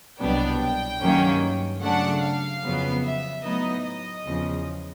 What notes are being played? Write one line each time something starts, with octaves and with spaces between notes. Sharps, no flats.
C2 B2 F#3 B3 D4 G5
G2 D#3 F#3 A#3 C#4
C#3 F#3 A3 D4 F#5
F5
F2 C#3 F#3 B3
E5
A2 F#3 B3 D#4 D#5
D#5
E2 C#3 F3